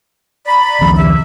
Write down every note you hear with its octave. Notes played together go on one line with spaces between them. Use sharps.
D5 A#5 B5
C#2 D#3 F3
C3 E5